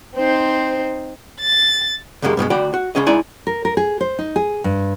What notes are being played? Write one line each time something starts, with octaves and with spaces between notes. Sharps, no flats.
C4 D#4 C5
A6
C#2 F#2 C#3 G#3 A#3 G4
G2 B2 G3 G#3
D2 F#4 D5 G5 B5
F#4
C#2 G2 C#3 C#4 G#4 D#5
G#3 D#4 E4 D5 G#5
A#4
A#4
G#4
C5
D#4
G#4
G2